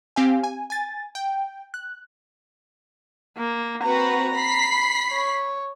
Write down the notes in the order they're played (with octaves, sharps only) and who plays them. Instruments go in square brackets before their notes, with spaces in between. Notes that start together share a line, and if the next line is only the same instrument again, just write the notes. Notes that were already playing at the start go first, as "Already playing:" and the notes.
[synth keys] C4 G4 F5 G#5
G#5
G#5 A6
G5
F#6
[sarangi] A#3
[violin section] C4 F#4 B4 [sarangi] A#5
[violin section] B5 B6 C7
[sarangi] C#5